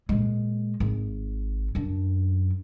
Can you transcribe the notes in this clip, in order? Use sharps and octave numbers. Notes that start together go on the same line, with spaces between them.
A#2 G#3
G#1
F#2 D4